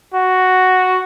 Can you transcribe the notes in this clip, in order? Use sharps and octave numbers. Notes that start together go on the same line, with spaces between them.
F#4